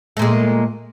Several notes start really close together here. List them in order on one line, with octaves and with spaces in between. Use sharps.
A3 A#2 G#3